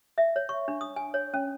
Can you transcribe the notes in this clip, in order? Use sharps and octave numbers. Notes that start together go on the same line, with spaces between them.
E5
C#5
C#6
D4
D#6
G#5
C#5
C#4